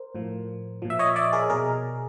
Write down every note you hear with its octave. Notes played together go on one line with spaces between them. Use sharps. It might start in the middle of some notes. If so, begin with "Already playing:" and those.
Already playing: A#4 C5
A2 F3
A#2 F3
E5
C#5 D#5
D5 E5
G#4 A#4
B2 G#4 A#4